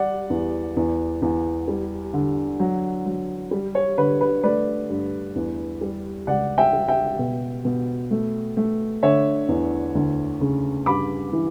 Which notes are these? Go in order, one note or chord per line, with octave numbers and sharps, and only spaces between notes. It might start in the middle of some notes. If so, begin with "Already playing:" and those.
Already playing: G3 D5 F#5
E2
E2
E2
G3
D3
F#3
F#3
G3
C#5
D3 B4
B4
A3 B4 D5
G2
E2
G3
C#2 D5 F#5
E5 G5
G3
E5 G5
B2
B2
A3
A3
D3 C#5 E5
E2
D2
C#3
G2 B5 D6
E3